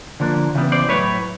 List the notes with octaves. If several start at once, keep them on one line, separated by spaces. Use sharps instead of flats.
D3 F3 A#3 D4
C#3 E3 G3 B3
C5 D5
A2 F#3 A3 B4 C#5